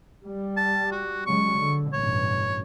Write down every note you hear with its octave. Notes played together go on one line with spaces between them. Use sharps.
G3
A5
F#4
C#3 F#3 G#3 C#6
D3
A1 G2 B2 C#5